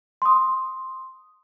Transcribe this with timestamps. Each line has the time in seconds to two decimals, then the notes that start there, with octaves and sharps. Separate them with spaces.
0.22 C6 D#6